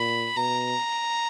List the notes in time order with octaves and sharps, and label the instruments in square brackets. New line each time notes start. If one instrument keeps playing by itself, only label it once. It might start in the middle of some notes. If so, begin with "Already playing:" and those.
Already playing: [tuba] A#2 [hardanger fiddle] B5
[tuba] B2 [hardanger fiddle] A#5